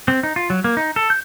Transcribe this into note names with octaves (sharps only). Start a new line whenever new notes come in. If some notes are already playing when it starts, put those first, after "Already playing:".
C4
D#4
F4
F#3
A#3
D#4
A4
G6